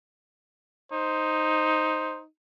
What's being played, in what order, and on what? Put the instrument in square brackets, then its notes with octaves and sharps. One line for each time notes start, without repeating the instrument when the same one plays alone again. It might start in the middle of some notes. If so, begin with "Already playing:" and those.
[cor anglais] D#4 [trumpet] C5